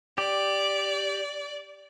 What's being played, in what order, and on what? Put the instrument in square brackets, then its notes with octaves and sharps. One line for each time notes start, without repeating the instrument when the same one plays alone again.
[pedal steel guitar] G4 [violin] D5